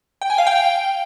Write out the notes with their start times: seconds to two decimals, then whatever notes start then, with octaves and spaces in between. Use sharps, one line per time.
0.21 G5
0.30 G#5
0.38 F5
0.47 G5